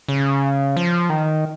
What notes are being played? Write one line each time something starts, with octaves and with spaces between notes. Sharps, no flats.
C#3
F3
D#3